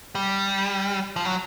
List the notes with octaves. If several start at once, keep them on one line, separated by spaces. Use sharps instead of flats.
G3
F3
F#3